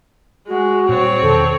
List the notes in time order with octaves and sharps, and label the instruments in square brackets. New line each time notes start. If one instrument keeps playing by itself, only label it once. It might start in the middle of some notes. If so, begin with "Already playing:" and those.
[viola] G#3 [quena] F#4
[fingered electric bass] A#2 G3 [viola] C4 C#5
[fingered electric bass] E2 B2 D#3 [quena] A4